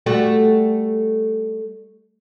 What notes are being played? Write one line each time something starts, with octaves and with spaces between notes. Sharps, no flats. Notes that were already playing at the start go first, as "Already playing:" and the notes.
G3 A3 F#4